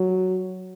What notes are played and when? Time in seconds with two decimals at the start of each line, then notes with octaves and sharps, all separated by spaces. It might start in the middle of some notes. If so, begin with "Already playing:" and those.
Already playing: F#3